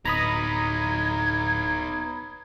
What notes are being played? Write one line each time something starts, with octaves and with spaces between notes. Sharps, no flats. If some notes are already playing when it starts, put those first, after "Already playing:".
D1 B3 D#4 A#5 B5 D#6 G#6